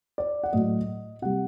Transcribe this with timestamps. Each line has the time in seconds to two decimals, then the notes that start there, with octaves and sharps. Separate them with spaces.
0.18 D5
0.43 F#5
0.53 A2 F#3 A3 D#5
1.22 C3 G3 F#5